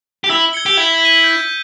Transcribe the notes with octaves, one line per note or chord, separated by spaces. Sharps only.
G4
E4 E6
G#6 C#7 G7
G4
E4 G#6
B6 D#7
G6